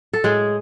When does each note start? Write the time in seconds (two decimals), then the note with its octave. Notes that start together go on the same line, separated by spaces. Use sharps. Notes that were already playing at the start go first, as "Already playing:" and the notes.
0.13 A4
0.24 A2 G#3 G#4